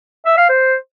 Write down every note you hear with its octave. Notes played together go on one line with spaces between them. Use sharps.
E5
F5
C5